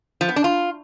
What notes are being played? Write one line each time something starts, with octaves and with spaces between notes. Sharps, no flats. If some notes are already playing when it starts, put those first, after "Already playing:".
F3
B3
D4
F4